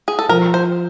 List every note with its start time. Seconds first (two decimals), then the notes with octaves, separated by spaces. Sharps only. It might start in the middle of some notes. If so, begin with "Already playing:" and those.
0.08 G#4
0.19 A4
0.29 F3 A#4
0.54 C5